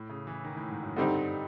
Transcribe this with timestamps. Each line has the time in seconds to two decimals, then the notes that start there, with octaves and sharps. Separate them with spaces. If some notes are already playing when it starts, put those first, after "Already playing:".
Already playing: A2
0.10 C#3
0.27 E3
0.44 D#3
0.57 A2
0.70 G#2
0.83 F#2
0.96 G2 D3 G3 C4 D#4
1.14 G2